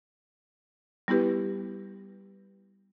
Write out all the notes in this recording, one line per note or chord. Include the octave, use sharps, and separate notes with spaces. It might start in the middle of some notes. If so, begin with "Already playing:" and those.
G3 B3 E4 G4 B4